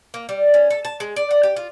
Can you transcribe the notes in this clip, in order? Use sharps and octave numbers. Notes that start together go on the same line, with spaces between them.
A#3
G3
C#4
A4
A5
G#3
D5
F#5
G4
F4